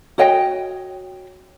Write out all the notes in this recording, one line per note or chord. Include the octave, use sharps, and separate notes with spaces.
F#4 C#5 D#5 G5